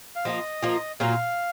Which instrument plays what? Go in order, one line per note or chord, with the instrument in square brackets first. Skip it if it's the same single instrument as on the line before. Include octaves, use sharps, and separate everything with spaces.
[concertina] F5
[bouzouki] F3 A#3 F4 [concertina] D#5
[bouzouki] F3 A#3 F4
[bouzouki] A#2 F#3 A#3 F4 [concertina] F5